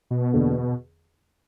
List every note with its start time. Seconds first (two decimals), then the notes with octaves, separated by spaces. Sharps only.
0.10 B2
0.33 E2 D3 A#3